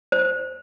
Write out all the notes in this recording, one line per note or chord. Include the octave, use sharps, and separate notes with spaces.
C5